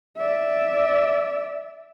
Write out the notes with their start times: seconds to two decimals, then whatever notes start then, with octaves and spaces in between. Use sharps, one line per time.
0.18 D5 E5